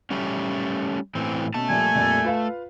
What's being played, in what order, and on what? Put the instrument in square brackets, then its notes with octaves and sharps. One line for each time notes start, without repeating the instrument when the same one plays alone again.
[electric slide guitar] G3 A3 C#4
A2 E3 C4
[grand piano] B2 C#4 [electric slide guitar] A3 A5
[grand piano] A#2 F3 G3 [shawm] G#5
[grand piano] F2 A#2 G3
F4 B4 F5